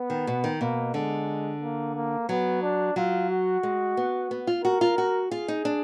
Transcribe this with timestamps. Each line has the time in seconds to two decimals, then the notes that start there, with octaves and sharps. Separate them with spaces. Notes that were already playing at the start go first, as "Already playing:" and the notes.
Already playing: B3
0.10 D#3
0.27 B2
0.44 D#3
0.60 B2 A#3
0.94 D3 G#3
1.62 A#3
1.95 A#3
2.29 F#3 B3
2.62 D4
2.96 F#3 F4
3.29 F#4
3.63 G#3
3.97 B3
4.31 B3
4.47 F4
4.64 F#4 A#4
4.81 F4
4.98 F#4
5.31 F4 G#4
5.48 D#4
5.65 D4